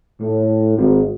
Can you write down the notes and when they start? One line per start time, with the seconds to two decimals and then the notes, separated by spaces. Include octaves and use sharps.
0.21 A2
0.78 G#1